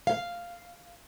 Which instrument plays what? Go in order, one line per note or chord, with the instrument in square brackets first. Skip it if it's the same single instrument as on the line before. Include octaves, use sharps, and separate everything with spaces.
[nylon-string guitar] F5